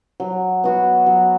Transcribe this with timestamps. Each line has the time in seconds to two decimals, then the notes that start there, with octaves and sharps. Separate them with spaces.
0.20 F#3
0.64 B3 F#4
1.06 F#3